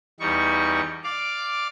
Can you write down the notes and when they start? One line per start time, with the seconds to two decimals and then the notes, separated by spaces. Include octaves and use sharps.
0.20 E2 G3 D#4 C#6
1.04 D5 F5 D6